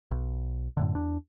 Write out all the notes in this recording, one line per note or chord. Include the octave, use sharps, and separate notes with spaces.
B1
F#2 A2 D3
E2 D4